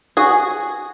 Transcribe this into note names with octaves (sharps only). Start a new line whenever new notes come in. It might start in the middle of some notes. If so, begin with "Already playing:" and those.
F#4 G#4